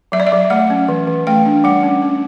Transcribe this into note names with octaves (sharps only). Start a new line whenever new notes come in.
F#3 E5
D5
E5
F#3
A3 F#5
C#4
E3
E3
A3 G5
D4
G3 F#5
C#4
C#4